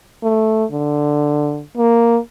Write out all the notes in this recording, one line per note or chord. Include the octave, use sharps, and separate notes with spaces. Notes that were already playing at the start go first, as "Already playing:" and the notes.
A3
D3
A#3